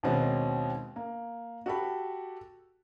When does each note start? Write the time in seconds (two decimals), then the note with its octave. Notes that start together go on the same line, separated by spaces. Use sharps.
0.03 D#2 B2 D#3 G#3 C4 C#4
0.96 A#3
1.66 F#4 G4 A4 B5